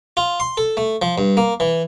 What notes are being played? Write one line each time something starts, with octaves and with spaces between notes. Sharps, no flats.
F4
C6
A4
A3
F3
G2
A#3
E3